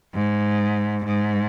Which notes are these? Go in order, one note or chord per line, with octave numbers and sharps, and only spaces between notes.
G#2
G#2